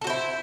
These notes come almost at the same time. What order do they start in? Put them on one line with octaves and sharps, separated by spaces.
A4 F#4 C5 E4